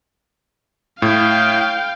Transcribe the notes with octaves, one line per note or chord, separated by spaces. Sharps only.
A2 F5 G5